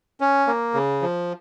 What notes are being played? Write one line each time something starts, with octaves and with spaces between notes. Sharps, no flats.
C#4
A#3
C#3
F3